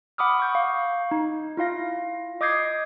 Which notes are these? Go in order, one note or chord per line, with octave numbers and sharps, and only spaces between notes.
F#5 B5 D6 D#6 F6
C#6 G6
F5
D#4
E4 F4 F5 A#6
D#5 D6 D#6 G6 G#6 C7